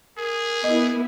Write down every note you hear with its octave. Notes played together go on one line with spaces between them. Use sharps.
G#4 A#4
B3 E4 D#5